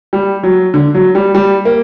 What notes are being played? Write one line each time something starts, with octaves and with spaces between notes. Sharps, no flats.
G3
F#3
D3
F#3
G3
G3
A#3